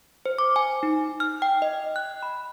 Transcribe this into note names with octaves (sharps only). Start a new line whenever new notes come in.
C5
D6
G#5
D#4
F6
G5
D#5
F#6
B5